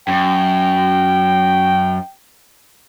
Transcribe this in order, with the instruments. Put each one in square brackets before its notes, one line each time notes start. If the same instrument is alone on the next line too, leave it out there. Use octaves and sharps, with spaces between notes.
[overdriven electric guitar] F#2 [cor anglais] G5